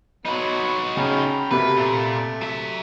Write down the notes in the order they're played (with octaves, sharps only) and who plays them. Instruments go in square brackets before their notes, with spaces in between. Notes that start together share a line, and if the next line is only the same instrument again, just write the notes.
[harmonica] F#3 B3 B4 [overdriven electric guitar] D#4 F#4
[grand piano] C#3 [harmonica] G5 A#5 B5
[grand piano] C3 [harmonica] A3 A#3 F#4 [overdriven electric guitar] B4
[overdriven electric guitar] A#2 [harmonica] A3
[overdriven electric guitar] F#3 E5